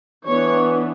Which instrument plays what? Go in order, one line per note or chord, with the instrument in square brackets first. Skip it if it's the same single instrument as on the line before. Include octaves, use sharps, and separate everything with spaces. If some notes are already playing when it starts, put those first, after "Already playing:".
[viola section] E3 B3 D4 C#5